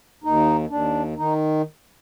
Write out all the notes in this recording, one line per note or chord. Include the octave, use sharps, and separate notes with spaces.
D#2 D#4
D#2 D4
D#3 D#4